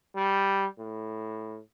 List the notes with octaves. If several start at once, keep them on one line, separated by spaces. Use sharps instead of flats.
G3
A2